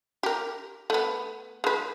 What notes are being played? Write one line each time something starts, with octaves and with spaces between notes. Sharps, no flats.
G4 A#4
A3 B3
G#3 B4